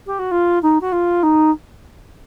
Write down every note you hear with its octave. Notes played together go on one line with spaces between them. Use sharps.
G4
F#4
F4
D#4
F#4
F4
D#4